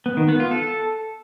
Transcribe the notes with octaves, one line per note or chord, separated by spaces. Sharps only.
B3
D#3
B3
F4
A4